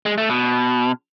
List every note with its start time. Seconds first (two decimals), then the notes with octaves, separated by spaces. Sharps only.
0.06 G#3
0.18 A3
0.30 B2